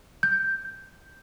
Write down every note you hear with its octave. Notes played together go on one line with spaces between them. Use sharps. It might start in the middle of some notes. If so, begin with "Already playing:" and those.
G6